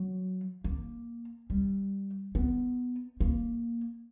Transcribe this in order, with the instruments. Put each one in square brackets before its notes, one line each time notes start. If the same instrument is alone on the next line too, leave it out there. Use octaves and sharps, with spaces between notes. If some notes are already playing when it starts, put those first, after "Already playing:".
Already playing: [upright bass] F#3
A#3
G3
B3
A#3